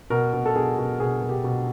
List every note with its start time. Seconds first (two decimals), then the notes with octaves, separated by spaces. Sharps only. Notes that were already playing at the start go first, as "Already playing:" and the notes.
0.10 B2 A#4
0.33 B2
0.46 A4
0.56 B2 G#4
0.78 B2
1.00 B2 G#4
1.21 B2
1.29 G4
1.44 B2